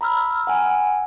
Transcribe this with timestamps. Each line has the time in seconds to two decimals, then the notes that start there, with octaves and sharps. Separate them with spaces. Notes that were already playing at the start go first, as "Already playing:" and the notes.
0.01 A#5 B5 E6 F6
0.47 F#5 G#5